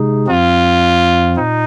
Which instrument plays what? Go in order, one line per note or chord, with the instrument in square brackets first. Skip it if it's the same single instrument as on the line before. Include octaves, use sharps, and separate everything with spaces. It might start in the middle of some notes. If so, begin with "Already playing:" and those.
Already playing: [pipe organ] C3 G#3 D#4 G#4
[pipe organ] F2 F3 C4 [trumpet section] F4
[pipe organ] A#2 [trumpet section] D#4